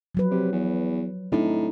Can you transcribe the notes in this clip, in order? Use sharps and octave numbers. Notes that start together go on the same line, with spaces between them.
F3 F#3 B4
C3
E2
A2 C4 D4 D#4